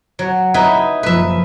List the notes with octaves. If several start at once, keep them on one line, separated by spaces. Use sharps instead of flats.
F#3
D#4 E4 B4
F#1 F3 B4 E5